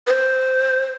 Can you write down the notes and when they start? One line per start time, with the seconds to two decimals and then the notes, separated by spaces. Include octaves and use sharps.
0.07 B4
0.10 C5